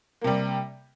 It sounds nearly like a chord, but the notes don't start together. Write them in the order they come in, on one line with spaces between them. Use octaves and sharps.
A#3 C3 G3